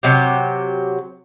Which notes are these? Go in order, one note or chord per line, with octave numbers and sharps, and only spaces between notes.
C3 F#3 G4